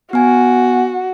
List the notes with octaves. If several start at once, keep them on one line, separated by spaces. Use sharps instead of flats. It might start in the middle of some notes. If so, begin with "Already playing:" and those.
B3 F#4 G#5